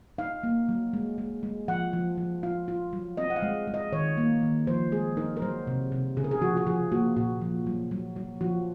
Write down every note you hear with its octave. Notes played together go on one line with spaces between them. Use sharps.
D#4 F5
A#3
F#3
G#3
G#3
G#3
F3 F#5
F3
F3
F4 F5
F4
F#3
C4 D#5
F#5
F5
G#3
G#3
D#5
D#3 C#5
A#3
D#3
F3 C5
G#3 G#4
D#4 A#4
A#4
F#3 C5
C3
C3
C#3 G#4
A#4
G#4
F3 F#4
F#4
F3 G#4
A#3 F#4
A#2 F#4
F3
F#3
F#3
F#3
F3 F#4